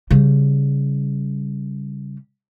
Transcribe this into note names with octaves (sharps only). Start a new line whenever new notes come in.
C#3 G3